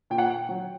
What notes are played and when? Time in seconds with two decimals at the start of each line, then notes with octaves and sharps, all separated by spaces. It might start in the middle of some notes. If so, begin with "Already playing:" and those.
0.10 A#2 G5
0.18 F#5
0.26 G5
0.49 F#3